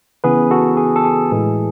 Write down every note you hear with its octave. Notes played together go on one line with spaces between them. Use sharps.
C#3 E3 B3 G#4 B4
F#4 A4
G#4
A4
G#4
A2 E3 G#3